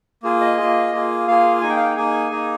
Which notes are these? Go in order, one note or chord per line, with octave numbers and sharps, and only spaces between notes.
A#3 F4 G#4
D#5
A#3 F4 G#4
A#3 F4 G#4
A#3 F4 G#4 F5
A#3 D#4 G#4 G#5
G5
F5
G5
A#3 D#4 G#4 G#5
A#3 D#4 G#4